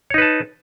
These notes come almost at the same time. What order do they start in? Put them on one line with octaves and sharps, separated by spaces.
C#5 D#4 B4 A5